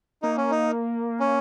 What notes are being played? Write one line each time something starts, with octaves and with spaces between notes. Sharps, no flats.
A#3 D#4
C#4
D#4
C#4